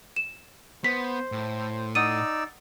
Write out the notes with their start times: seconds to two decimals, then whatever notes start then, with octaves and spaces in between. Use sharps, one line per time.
0.16 E7
0.84 B3 C5 B6
1.32 A2
1.95 D#4 D5 F#5 D#6 E6 D#7